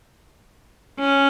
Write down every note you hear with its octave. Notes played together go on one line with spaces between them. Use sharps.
C#4